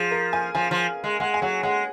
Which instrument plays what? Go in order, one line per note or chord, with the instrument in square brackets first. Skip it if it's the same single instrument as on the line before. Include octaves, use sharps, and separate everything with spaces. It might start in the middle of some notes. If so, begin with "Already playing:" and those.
Already playing: [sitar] F3 [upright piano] G#4
[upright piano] A#4
G#5
[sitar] F3 [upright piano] G#5
[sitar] F3
G#3
[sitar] G#3 [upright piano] F#5
[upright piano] G#5
[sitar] F#3 [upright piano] F#5
[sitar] G#3 [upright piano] F#5